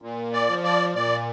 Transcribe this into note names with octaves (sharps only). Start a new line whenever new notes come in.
A#2
D5
F3
D5
A#2 D5